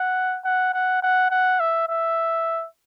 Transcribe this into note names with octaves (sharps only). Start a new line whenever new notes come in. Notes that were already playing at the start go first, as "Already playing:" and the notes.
Already playing: F#5
F#5
F#5
F#5
F#5
E5
E5